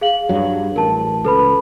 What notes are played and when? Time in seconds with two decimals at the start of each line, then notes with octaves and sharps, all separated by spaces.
0.01 G#4 F5 F#7
0.29 G2 F#3
0.76 A1 A#4 A5
1.25 C#2 A4 B4 B5